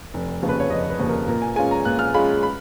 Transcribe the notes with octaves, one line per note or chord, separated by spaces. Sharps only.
F1
D#2 C#3 F3
B4
C#5
F1 D#5
B4
D#2 C#3 F3
A#4
A#2 A#4
G#5
G#3 C#4 F4 G#5
A#5
A#2 F#6
F6
G#3 C#4 F4 B5
B5